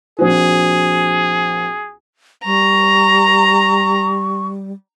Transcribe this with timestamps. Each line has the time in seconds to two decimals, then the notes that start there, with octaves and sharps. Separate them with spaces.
0.19 A#1 C4 F#4 G#4
2.45 G3 A#5 C#6